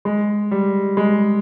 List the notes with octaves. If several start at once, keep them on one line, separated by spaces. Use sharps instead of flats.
G#3
G3
G#3